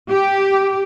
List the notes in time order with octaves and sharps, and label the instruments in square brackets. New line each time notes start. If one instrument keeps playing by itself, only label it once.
[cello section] G4